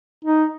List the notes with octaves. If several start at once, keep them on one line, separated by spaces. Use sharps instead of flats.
D#4